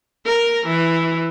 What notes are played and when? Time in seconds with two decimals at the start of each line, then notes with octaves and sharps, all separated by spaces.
0.24 A#4
0.66 E3